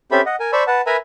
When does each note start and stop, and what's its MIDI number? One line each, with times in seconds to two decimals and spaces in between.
0.11 0.21 60
0.11 0.21 61
0.11 0.21 67
0.11 0.21 69
0.11 0.21 76
0.11 0.21 83
0.26 0.36 75
0.26 0.36 78
0.40 0.51 70
0.40 0.51 80
0.53 0.64 72
0.53 0.64 74
0.53 0.64 81
0.53 0.64 83
0.53 0.64 85
0.53 0.64 88
0.67 0.81 71
0.67 0.81 78
0.67 0.81 81
0.86 0.97 70
0.86 0.97 71
0.86 0.97 76
0.86 0.97 80
0.86 0.97 82
0.86 0.97 83